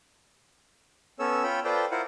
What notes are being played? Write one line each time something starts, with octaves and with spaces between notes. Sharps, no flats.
B3 C#4 A4 C#5 E6
F4 C#5 G5 B5
F4 A4 B4 C5 D5 G5
E4 F4 A#4 C5 F#5